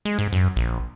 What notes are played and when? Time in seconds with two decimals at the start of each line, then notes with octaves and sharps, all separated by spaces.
0.05 G#3
0.19 G#2
0.33 F#2
0.56 A#1